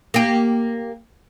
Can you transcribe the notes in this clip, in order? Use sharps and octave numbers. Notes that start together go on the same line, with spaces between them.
A#3 G4